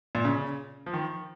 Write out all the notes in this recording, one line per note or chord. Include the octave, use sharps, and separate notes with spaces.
A#2
C#3
F3
D#3